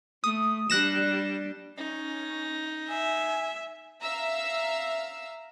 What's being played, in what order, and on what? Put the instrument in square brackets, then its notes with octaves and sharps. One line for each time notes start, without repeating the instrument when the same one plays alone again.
[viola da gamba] A3 [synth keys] D#6
[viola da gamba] G3 D4 [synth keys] F#6 A#6 E7
[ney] C#4 [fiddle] D#4
[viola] E5 [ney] G#5
[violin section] E5 F5 A#5 E6